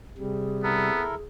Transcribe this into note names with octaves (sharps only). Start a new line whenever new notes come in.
C3 G3 G#4
B3 E4 A4 A#4